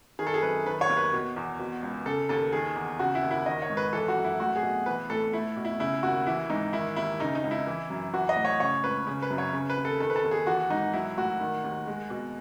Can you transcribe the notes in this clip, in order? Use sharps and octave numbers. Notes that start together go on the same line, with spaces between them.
D#3 G#4
A4
G#4
F#2 B4
D#3 B4
C#5
D#2
B4
B2
E2
B2
C#2
C#3 A4
D#2 A4
D#3 G#4
E2
C#3 F#4
E4
D#2
E4
D#3 D#5
C#5
G#2
B4
E3 A4
F#4
F#2
E4
A3 F#4
G#4
B2
E3 B4
A2 A4
A3 E4
B2
E4
C#3 E4
D#2 F#4
E3 E4
G#2 D#4
D#3 E4
D#2 E4
C#3 D#4
D#4
C#2
E4
E3
F#2
E3 F#4
D#5
A2
C#5
C#3 C#5
C#2 B4
C#3
B4
F#2
C#5
C#3
B4
D#2
A4
D#3 A4
B4
A4
D#2
G#4
E3 F#4
G#2 D#4
F#3 E4
A2 F#4
D#3
D#2
G#3
B2